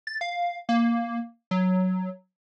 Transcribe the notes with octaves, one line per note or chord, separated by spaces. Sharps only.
A6
F5
A#3
F#3